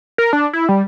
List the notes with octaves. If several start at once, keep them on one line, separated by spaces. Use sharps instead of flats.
A#4
D4
E4
G3